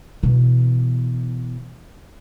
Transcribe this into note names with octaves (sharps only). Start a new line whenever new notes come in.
B2 E3